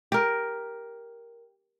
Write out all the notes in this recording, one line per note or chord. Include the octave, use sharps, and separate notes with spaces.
G4 A#4